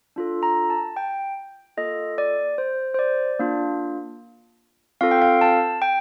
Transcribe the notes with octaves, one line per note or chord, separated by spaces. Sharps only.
D4 F4 A4
A#5
A5
G5
A#3 F4 A4 D#5
D5
C5
C5
D5
A#3 D4 F4
C4 F4 A4 F5
G5
F5
A5
G5